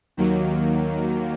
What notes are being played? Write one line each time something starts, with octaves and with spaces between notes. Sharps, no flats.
D#2 D#3 F#3 A#3